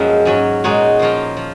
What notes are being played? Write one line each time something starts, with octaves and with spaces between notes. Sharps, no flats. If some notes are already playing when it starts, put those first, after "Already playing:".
Already playing: F#2 F3 G#3 A#3 C#4 G#4 B4
G#2 F#3 C#4
A#2 G#3 D#4 F#4 C#5
F3 A#3 F4 A#4 C#5
F3